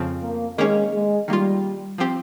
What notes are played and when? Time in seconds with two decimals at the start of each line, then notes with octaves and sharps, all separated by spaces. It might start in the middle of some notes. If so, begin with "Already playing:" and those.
Already playing: F2 C#3 F3 C4
0.23 A#3
0.58 D#3 G#3 A#3 C#4
0.93 G#3
1.28 D#3 G3 A#3 F4
1.98 F3 C4 G4